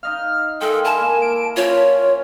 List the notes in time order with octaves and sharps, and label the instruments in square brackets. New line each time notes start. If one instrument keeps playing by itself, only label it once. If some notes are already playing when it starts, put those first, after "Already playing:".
[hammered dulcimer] D#4 D#5 F5 [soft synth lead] F6
[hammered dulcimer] G#3 A#4 F5 [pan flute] A4 [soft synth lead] G5
[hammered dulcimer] E4 [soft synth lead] G#5 [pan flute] A5
[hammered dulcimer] A#3
[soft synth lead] D7
[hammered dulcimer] F3 C#4 [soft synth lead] F4 [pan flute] C#5